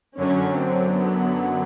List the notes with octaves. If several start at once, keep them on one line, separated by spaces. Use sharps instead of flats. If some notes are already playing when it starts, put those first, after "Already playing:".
F#2 D3 F#3 C#4
C4
B3